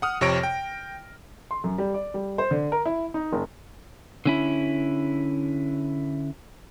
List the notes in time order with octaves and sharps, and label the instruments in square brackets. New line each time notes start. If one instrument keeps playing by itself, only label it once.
[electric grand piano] F#5 D#6 F6
F2 C3 C#5 C#6 A#6 D7
G5
[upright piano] C6
F#2
G3
D5
G3
C5
D3
A#4
E4
D#4
F#1
[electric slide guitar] D3 C#4 E4